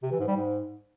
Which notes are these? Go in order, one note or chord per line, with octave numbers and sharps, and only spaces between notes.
C3
E3
G#2
G3
G#2